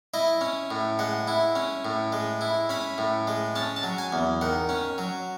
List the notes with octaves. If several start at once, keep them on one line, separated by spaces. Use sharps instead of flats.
E4 D#5
C#4
A2
G#3 F#5
E4
C#4
A2
G#3
E4
C#4 B5
A2
G#3
C#4 A5
A5
F#3
G#5
E2
D#3 F#5
C#4
F#3